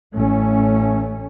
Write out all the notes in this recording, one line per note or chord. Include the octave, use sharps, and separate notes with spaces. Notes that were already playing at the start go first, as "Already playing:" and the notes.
A1 A3 C#4